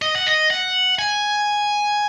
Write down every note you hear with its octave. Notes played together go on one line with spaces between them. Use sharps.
D#5
F#5
D#5
F#5
G#5